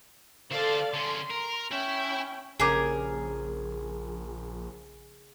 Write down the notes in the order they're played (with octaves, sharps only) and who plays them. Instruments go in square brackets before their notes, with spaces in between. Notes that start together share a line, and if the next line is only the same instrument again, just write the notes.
[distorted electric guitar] D3 C5 [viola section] A4 D5 F5
[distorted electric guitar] D3 C#4 [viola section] C6
[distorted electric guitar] A#4
[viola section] C#4 G5 [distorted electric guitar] E4 E5
[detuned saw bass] A#1 [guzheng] C#3 G4 [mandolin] G#4 A#4 [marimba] G#5 D6